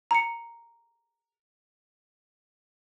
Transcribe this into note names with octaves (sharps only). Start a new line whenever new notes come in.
A#5 C#7